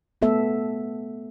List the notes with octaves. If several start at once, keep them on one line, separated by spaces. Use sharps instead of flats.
A3 B3 A4 E5